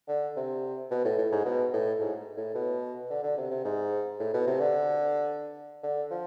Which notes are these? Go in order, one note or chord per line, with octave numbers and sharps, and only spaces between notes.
D3
C3
B2
A2
A2
G#2
B2
A2
G#2
A2
B2
D3
D3
C3
C3
G#2
A2
B2
C3
D3
D3
F3